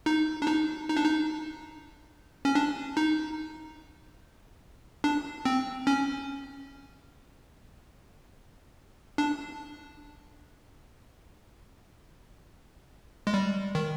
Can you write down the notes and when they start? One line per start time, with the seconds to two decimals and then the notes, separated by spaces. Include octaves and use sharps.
0.06 D#4
0.42 D4
0.47 D#4
0.89 D#4
0.97 D4
1.04 D#4
2.45 C#4
2.55 D4
2.97 D#4
5.04 D4
5.45 C4
5.87 C#4
9.18 D4
13.27 G#3
13.34 G3
13.75 D#3